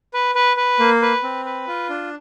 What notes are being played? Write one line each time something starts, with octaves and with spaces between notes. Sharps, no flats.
B4
B4
B4
A#3
B4
C4
B4
F4
D4